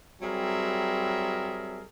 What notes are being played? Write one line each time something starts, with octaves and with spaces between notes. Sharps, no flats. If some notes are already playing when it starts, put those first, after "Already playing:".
F#3 G3 C4 G#4 A#4 E5